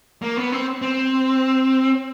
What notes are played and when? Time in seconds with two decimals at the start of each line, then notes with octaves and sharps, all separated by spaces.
0.22 A#3
0.37 B3
0.52 C4
0.82 C4